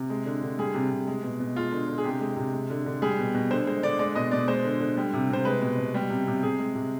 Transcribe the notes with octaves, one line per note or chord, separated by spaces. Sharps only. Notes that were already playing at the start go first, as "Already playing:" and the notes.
Already playing: C3
G#3
D3
D3
G3 G#4
C3
C3
G#3
B2
B2
G#3 F4
D3
D3
G#4
C3 G4
G#3
C3
G#3
D3
D3
G3 G#4
B2
B2
D3 C5
G#3 C5
D3 D5
G#3 D5
B2 D#5
B2 D5
G#3 C5
D3
D3
G3
C3
C3 C5
G#3 B4
B2
B2
G3
C3
C3
C3 G#4
G#3
C3